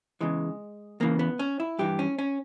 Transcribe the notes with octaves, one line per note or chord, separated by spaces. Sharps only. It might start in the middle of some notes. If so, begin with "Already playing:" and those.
E2 C#3 E3 G#3
E2 C#3 E3 A#3
B3
C#4
E4
G2 E3 G4
C#4
C#4